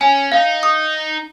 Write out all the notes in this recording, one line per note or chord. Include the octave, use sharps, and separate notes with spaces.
C#4 G#5
D#4 F5
D#6